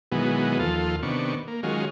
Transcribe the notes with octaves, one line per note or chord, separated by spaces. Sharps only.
B2 D#3 E3 F#3 G#3 B3
D#2 F3 F4 A4
C3 D#3 B3 D4 C#6
A#3
D#3 F#3 G#3 C#4 F4